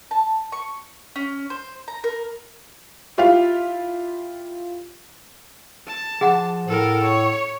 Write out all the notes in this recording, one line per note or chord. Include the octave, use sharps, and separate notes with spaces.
A5
C#6
C#4
C5
A#5
A#4
E4 F4 G4 F5
A5
F3 G#4 F#5
A2 A4 A#4
C#5